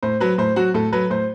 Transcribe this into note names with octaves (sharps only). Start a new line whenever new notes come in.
A2 C5
F#3 B4
A2 C5
F#3 F#4
A2 A4
F#3 B4
A2 C5